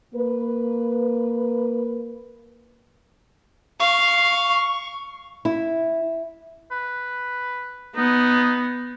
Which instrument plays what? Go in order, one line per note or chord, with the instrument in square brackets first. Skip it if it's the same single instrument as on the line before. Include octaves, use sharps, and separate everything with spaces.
[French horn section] A#3 B4
[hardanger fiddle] F5 [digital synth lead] C#6
[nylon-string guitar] E4
[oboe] B4
[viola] B3 [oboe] D#4